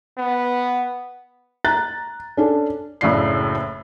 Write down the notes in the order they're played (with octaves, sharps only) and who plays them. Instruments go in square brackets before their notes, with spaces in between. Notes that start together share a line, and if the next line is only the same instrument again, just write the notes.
[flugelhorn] B3
[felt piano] A#5 F#6 A6
C#4 D4 A4
F#1 A2 C#3 D4 C7